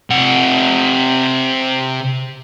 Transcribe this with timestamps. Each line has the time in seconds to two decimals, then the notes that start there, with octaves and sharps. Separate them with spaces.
0.10 C3 F#5